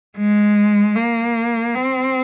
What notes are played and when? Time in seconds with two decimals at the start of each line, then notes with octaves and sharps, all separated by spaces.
0.18 G#3
0.96 A#3
1.75 C4